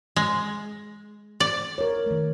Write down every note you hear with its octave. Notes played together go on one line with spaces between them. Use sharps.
G#3
D5
A#4 C#5
D#3 A3